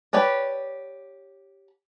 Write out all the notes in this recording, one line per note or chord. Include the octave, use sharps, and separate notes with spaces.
G4 B4 C#5 D5